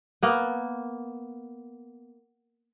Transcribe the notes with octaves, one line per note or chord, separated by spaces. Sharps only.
A#3 B3